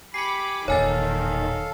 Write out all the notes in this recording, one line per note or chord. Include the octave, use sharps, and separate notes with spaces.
G4 G#5 B5 D6 C7 C#7
E1 A#2 D#3 A4 C#5 F5 G#5 A6